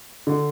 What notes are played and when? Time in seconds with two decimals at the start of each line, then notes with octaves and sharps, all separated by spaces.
0.27 D3